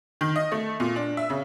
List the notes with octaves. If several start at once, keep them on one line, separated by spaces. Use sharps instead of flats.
D#3
D#5
A3
A#2
D4
E5
C#3